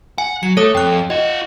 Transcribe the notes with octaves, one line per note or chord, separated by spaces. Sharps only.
F#5 G#5
F#3 C#7
A3 A4 C#5 D#6
F2 G5 F#6
F4 D#5 F#5